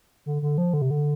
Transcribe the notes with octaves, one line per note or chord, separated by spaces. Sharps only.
D3
D3
F3
D3
C3
D3